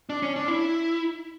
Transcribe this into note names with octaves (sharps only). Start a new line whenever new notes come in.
D4
C#4
D4
E4